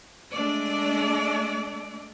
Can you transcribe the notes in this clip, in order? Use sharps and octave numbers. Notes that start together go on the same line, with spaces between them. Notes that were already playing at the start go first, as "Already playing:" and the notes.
G#3 A3 D4 D5